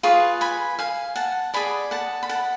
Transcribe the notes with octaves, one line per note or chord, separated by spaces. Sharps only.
F4 G#4 B4 C#6
G#5 B5
F5 G#5
F#5 A5
G#4 D5 G#5 B5
F#5 A5
B5
F#5 A5